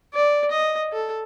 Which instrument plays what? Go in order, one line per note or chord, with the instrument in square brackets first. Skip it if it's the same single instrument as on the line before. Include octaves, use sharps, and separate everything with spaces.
[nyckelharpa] D5
D#5
A4